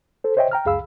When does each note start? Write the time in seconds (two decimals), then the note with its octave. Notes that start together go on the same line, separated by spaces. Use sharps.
0.24 A4 C5
0.37 C5 C#5 D#5 E5 G5
0.51 G5 A#5 F6
0.65 C#2 F#2 G#4 F5 B5 E6